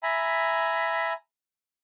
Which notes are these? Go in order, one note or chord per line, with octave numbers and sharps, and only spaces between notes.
E5 G#5 A#5 B5